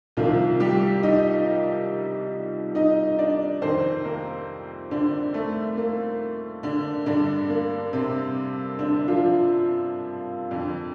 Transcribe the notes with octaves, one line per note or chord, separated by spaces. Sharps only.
C2 C3 D#3 F3 F4
G3 G4
D#4 D#5
D#4 D#5
D4 D5
F2 C3 D#3 C4 C5
A#3 A#4
D3 D4
A3
A#3
D3 D4
G2 D3 D4
A#3
C3 C4
D3 D4
F3 F4
F2 D3